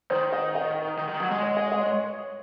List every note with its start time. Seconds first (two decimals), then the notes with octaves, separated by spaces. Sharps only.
0.10 D#3 C5
0.33 D#5
0.55 D#5
0.98 D#3
1.09 D#3
1.20 F#3
1.31 G#3
1.42 C#5
1.57 D#5
1.72 D#5
1.85 C#5